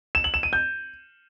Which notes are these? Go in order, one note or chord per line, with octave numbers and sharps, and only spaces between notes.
E7
F#7
E7
D#7
G6